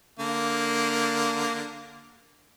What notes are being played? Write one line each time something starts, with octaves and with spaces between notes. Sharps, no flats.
D3 A#3